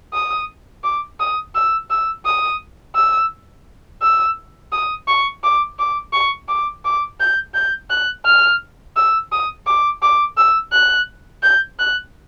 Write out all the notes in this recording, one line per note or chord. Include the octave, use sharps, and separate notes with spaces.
D#6
D6
D#6
E6
E6
D#6
E6
E6
D#6
C#6
D6
D6
C#6
D6
D6
G6
G6
F#6
F6
E6
D#6
D6
D6
E6
F#6
G6
F#6